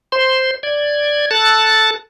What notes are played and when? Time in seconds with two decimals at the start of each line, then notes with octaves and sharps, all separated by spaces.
0.12 C5 C6
0.63 D5 G#6
1.31 A4 A5 F#6 A6